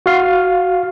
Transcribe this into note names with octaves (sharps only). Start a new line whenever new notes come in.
F#4 F5